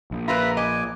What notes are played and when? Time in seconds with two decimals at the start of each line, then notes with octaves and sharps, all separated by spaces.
0.11 A#1
0.28 F4 A#4 B4 E5 A#5 B5
0.57 D#5 G#5 D6